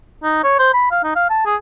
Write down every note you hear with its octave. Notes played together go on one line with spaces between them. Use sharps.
D#4
C#5
C5
B5
F5
D#4
F5
A5
G#4